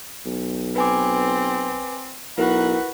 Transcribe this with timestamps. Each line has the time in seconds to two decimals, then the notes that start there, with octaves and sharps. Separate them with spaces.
0.25 B1
0.76 C4 B4 G#5 D6
2.38 B1 E4 F#4 A#4 B4